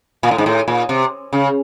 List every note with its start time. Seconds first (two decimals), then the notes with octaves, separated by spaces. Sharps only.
0.23 A#2
0.31 A2
0.38 G#2
0.46 A2
0.68 A#2
0.89 C3
1.33 C#3